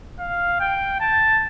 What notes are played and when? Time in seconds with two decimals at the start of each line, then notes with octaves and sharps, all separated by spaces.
0.19 F5
0.60 G5
1.01 A5